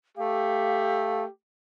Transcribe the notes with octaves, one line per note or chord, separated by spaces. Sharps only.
A3 G4 F5